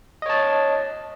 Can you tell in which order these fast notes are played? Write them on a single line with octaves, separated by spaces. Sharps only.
D#5 C#5 A5